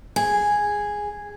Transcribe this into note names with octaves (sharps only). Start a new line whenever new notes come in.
G#4